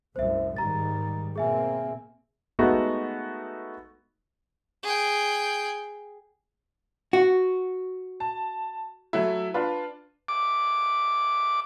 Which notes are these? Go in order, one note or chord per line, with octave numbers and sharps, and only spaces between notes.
C2 F#2 A2 C5 E5
G#2 D#3 G3 A#5 A6
B2 A#3 C4 G#4 E5 G#5
G#3 A3 B3 D#4 F#4
G#4 G5
F#4
A5
F#3 A3 E4
D4 F4 B4
D6